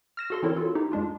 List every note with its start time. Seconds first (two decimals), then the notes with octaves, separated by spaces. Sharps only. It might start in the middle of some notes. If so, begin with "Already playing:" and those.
0.17 F6 A#6 E7
0.30 F#4 A4 C6
0.43 E3 C4 E4 A4 A#4 C#5
0.56 F4 F#4 A4
0.75 D#4 E4 G4
0.92 F#2 G#3 D4 F4